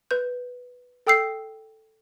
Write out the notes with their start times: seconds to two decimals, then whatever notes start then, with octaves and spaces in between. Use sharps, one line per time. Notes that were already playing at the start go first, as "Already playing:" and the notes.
0.11 B4 G6
1.07 A4 G5 D#6 E6 G6 C7